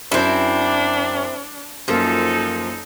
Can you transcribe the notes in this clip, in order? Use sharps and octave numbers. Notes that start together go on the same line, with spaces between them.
F#2 C4 D4 E4
F#2 F3 A#3 D#4 A4